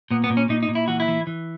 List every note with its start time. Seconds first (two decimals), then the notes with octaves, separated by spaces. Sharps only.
0.11 A#2 B3
0.24 B3
0.30 A#2
0.37 C#4
0.49 A#2 D#4
0.63 D#4
0.69 A#2
0.75 E4
0.88 E3 F#4
1.00 E4
1.08 E3
1.27 E3